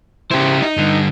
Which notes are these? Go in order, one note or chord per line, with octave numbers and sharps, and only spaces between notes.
C#3 E4 G4 C5
D#4
G2 D3